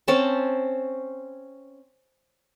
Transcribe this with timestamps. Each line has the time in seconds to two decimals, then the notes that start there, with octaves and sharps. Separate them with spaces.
0.08 C4 C#4 A5